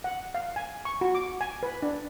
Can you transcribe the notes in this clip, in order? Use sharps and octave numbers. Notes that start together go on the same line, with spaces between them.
F#5
F5
G#5
C#6
F#4
D6
G#5
B4
D4